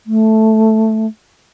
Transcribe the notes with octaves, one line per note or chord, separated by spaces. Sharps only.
A3